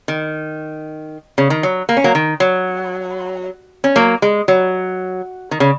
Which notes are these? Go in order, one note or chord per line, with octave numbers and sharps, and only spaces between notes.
D#3
C#3
D#3
F#3
A#3
C#4
F#3 A#3
D#3
F#3
C#4
F#3 A#3
G#3
F#3
D#3
C#3